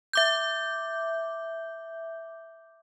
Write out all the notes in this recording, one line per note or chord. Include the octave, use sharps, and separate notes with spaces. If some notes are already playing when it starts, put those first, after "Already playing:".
E5 D6 G6